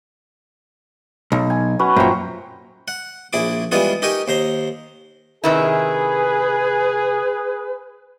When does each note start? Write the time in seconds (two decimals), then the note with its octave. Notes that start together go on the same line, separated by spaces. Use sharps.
1.32 B1
1.50 G#5
1.79 C#4 F#4 B4
1.96 F#2 A#2 C5 G5 A#5
2.88 F#5
3.33 A#1 E4 G#4 D6
3.72 E3 G3 G#3 B3 F4 G#4
4.02 D#4 G4 A#4 G#5 C#6
4.28 D#2 C5 A#5 C6
5.44 C3 D#3 E4 G#4 B4